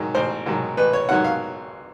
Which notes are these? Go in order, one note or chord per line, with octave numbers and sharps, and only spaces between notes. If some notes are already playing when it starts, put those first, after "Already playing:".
Already playing: G#2 D#3 F#3
A1 C5
G#2 D#3 F#3
A1 B4
C#5
G#2 D#3 F#3 F#5
F5